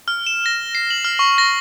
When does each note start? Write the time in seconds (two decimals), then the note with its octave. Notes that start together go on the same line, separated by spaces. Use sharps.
0.08 F6
0.27 E7
0.46 A#6
0.75 C7
0.90 F#7
1.04 F6
1.19 C#6
1.38 A#6